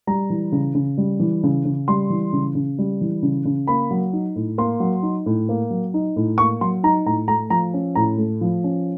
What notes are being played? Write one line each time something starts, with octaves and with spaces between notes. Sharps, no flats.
G3 A#5
E3
C#3
C#3
G3
E3
C#3
C#3
G3 C6
E3
C#3
C#3
G3
E3
C#3
C#3
A#3 B5
F#3
D#4
A2
A#3 C6
F#3
D#4
A2
A#3
F#3
D#4
A2
A#3 C#6
F#3 C6
D#4 A#5
A2 A#5
A3 A#5
F3 A#5
C#4
A2 A#5
A3
F3
C#4